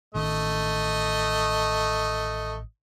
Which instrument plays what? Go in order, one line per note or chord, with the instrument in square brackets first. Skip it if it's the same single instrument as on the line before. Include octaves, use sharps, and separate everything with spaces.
[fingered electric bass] A1 D#3 C#4 [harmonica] A3 D#5